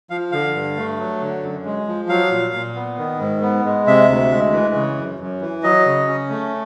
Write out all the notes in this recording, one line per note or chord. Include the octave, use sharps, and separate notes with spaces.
F3 F5
D3 F5
G2
A3
F#3
D3
F#2
G#3
F3
F#3 F5
A#2
A#2
B3
D#3
G#2
B3
G#3
C3 E5
D2
G#3
E3
C#3
F#2
F#2
E3
F#3 D#5
C#3
C#4
A3